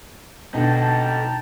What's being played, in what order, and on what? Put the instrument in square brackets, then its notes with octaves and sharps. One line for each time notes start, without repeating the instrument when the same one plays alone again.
[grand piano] B2 D3 [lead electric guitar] D#4 A4 [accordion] G5 A5 A#5